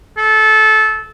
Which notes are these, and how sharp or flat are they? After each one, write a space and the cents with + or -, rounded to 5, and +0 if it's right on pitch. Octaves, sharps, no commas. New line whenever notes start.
A4 -20